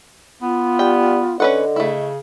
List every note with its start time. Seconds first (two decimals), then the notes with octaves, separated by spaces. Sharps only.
0.42 B3 F4
0.79 G3 G5
1.40 D3 C#4 B4 D#5 F#5
1.76 C#3 A3 E4